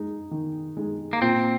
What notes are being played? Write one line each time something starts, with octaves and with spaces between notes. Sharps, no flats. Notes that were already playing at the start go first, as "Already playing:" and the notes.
Already playing: G#3 D#4 G#4
D#3
G#3 D#4 G#4
A#3
A#2 C4